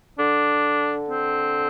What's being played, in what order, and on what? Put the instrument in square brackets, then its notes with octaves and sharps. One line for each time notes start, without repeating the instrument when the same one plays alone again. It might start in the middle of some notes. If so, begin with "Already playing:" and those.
[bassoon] D3 [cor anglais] D4
[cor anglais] C4